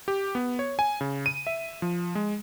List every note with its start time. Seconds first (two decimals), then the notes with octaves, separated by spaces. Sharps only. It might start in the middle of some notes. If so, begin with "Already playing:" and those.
0.08 G4
0.35 B3
0.59 C#5
0.79 G#5
1.01 C#3
1.26 D#7
1.47 E5
1.82 F3
2.15 G#3